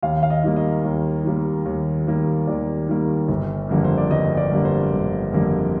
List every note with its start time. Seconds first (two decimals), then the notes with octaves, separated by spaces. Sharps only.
0.03 D#2 F5
0.23 F5
0.30 D#5
0.43 D#3 G3 A#3
0.56 D#5
0.84 D#2
1.24 D#3 G3 A#3
1.66 D#2
2.07 D#3 G3 A#3
2.47 D#2 D5
2.88 D#3 G3 A#3
3.28 G1
3.69 F2 D3 G3 A#3
3.84 C5
3.98 D5
4.11 G1 D#5
4.37 D5
4.51 F2 D3 G3 A#3
4.65 C5
4.92 G1
5.33 F2 D3 G3 A#3